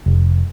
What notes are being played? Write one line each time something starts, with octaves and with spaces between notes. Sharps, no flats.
F1